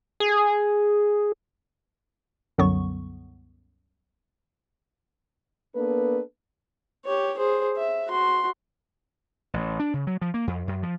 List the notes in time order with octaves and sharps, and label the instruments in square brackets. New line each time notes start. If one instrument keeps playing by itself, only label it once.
[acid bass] G#4
[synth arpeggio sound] C2 F#2 D3 F#3 B3 C#6
[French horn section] A#3 B3 D4 A4 B4
[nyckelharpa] G4 C#5
G#4 C5
E5
F#4 C6
[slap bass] A1
D4
C#3
F#3
F3
A#3
F2
F#2
F3